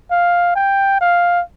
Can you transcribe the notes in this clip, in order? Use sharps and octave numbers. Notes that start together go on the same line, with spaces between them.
F5
G5
F5